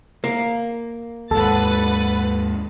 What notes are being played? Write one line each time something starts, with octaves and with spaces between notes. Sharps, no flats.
A#3
D#2 G#2 A4 B4 F#5 A6